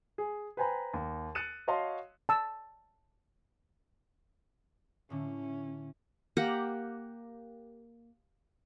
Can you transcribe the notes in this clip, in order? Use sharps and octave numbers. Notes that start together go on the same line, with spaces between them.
G#4
B4 C5 G5 G#5 A#5 B5
D#2
F#6 A6 C#7 D#7 E7
F#4 C#5 D#5 F5 A5 C6
A5 E6
A2 D3 A3 C#4
A#3 G4 A#4 F#5